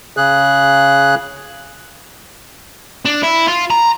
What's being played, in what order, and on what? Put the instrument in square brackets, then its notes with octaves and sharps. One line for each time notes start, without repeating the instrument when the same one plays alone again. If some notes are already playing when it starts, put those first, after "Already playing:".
[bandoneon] C#3 G#4 F#6
[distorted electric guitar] D4
E4
F4
A#5